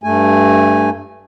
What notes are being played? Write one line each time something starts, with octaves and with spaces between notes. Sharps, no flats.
G2 A3 G#5